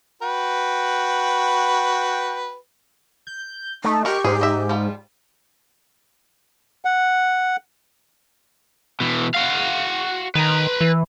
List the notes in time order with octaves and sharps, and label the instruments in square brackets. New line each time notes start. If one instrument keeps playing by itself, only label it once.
[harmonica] F#4 B4 G5
[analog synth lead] G6
[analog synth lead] A3 [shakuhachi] D#4
[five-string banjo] G#3 A#4 [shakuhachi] G4 [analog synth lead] C#6
[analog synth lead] G#2 [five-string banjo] C#4 G#4
[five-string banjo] D#5 E5
F3 G3 F4
[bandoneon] F#5
[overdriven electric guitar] B2 E3
F#4 F5
[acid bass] D#3 [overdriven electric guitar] B4 A#5
[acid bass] E3